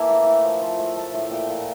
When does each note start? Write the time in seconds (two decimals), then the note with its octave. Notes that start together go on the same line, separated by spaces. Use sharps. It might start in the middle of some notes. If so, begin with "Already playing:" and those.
Already playing: E3 A#3 A5
0.09 A2
0.26 A2
0.44 F3
0.61 F3
0.79 A3
0.97 A3
1.14 A2
1.31 A#2 G5
1.49 A#2